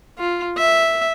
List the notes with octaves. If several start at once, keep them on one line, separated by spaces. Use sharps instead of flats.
F4
E5